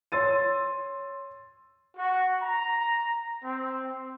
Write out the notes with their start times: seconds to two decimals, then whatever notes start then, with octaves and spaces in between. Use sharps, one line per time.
0.12 C#5 C6 E6 A6 D#7
1.97 F#4
2.42 A#5
3.44 C4